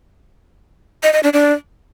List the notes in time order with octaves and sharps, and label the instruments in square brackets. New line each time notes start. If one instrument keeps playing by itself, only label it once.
[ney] D#5
D#5
D4
D4